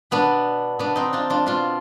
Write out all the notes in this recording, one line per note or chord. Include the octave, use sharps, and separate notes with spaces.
B2 B3 D4
B2 B3 D4
C4 D#4
D4 F4
D4 F4
B2 D4 F4